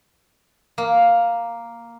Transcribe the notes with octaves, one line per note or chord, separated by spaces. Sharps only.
A#3